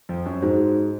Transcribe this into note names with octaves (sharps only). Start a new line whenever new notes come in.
F2 F3
F#2 F#3
G#2 G#3 D#4 F#4 C5